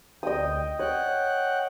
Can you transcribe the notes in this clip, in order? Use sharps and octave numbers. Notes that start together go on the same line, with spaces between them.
D2 D#5 G5 D#6
C#5 F#5 G5 F#6